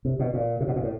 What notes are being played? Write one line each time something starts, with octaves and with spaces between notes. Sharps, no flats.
C3
B2
A#2
C3
B2
A#2
A2